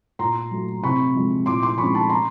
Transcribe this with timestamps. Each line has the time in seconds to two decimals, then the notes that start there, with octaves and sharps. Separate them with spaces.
0.19 A#2 A#5 C6
0.51 F#3 A3
0.82 C3 B5 C#6
1.15 F3 G#3
1.46 A#2 C6 D6
1.62 C6 D6
1.78 F3 G#3 C#4 B5 C#6
1.95 A5 B5
2.09 A#5 C6